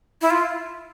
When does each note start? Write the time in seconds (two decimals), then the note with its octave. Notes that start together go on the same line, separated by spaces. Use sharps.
0.21 E4
0.30 F4